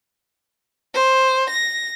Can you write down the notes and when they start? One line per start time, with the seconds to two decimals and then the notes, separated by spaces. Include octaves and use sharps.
0.94 C5
1.50 A#6